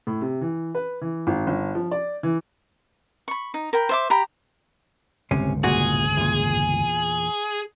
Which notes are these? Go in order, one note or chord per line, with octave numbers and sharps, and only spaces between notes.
A2
C3
E3
B4
E3
G#1
G1
F3
D5
E3
B5 C#6
D#4
A#4 G5 B5
C5 E5 D6
G4 A#5 B5
G1 C#2 A2 C3 C#4
C2 A#2 F#4 G#4
E2 A#2